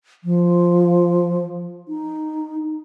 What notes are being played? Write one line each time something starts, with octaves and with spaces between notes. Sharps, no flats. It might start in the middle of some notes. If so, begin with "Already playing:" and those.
F3
D#4